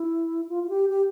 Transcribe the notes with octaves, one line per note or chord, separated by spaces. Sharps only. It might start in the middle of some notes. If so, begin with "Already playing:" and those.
Already playing: E4
F4
F4
G4
G4